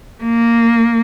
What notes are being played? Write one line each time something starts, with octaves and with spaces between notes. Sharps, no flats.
A#3